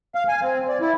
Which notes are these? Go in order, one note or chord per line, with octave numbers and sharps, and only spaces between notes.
F5
G#5
C4
D5
E4